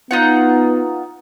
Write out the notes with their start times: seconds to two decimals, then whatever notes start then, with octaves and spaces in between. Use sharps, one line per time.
0.11 B3 D#4 F4 F#5